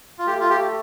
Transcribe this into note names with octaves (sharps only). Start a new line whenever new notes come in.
F4
A3 G4
F4
G4